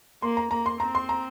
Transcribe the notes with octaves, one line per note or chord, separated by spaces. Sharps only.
A#3 C6
A#5
A#3 A#5
C6
C4 A#5
C6
A#5